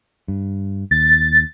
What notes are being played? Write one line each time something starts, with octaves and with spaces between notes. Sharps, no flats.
G2
D#2 A6